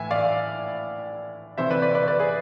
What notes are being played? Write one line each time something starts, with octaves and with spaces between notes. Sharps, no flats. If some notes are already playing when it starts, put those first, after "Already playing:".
Already playing: A2 E3 E5 G#5
D5 F5
C3 E3 C5 E5
B4 D5
B4 D5
B4 D5
B4 D5
G#4 B4